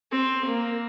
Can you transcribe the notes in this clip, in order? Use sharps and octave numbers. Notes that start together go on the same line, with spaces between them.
C4
A#3